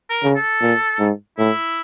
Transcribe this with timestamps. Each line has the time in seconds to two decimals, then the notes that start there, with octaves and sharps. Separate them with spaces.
0.10 A#4
0.23 C#3
0.36 A4
0.61 A#2
0.99 G#2
1.38 A2 E4